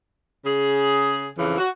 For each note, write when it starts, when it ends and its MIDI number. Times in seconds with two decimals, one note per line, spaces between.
0.45 1.28 49
0.45 1.28 68
1.37 1.57 41
1.37 1.57 49
1.37 1.57 52
1.58 1.68 66